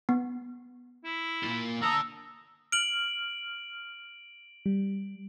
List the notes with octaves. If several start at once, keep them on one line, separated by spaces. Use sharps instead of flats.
B3
E4
A#3 F4
D3 A5 A#5 D#6 E6
F6 D7 F#7
G3